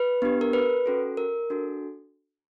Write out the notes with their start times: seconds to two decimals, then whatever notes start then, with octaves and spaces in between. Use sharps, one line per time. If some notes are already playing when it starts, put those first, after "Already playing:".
Already playing: B4
0.22 B3 D4 G4
0.41 A#4
0.53 B4
0.86 C#4 F#4 A4
1.17 A#4
1.50 D4 F#4 A4